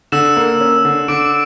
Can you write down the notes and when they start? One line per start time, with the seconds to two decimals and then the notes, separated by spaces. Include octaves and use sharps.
0.12 D3 E6 E7
0.37 A#3
0.61 C#4
0.85 D3
1.08 D3 D6 D7